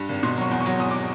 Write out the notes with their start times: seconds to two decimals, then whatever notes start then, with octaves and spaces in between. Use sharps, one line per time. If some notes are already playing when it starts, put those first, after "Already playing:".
Already playing: G2
0.09 G#1
0.23 B2 C6
0.38 F#3 C#6
0.51 E2
0.60 C#6
0.66 F#3
0.79 E2 D#6
0.91 D6